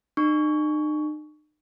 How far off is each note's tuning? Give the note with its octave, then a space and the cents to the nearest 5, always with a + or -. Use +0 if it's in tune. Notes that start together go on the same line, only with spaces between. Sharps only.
D#4 -45 C#6 +15